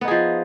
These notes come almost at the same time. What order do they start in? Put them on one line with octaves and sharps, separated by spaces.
B3 D#4 G#4 F3